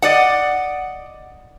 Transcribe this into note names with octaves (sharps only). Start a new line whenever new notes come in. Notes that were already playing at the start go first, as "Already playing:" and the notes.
D5 D#5 F#5